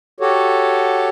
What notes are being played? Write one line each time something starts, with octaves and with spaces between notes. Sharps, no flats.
F#4 G4 A4 C#5